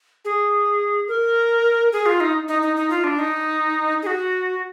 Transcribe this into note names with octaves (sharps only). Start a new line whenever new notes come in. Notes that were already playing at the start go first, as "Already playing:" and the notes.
G#4
A#4
G#4
F4
D#4
D#4
D#4
D#4
F4
D4
D#4
G#4
F#4